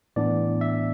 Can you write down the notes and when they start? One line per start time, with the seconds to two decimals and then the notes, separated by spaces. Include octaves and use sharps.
0.16 A2 E3 B3 D4 D5
0.61 E5